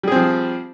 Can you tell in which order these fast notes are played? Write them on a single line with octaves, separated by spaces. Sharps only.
G3 G#4 C4 F3